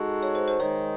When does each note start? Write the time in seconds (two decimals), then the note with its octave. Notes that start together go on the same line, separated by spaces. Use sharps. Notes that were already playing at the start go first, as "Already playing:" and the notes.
Already playing: G#3 D#4 F#4 A4
0.23 C#5
0.35 C5
0.48 C5
0.60 D#3 G#3 D#4 C#5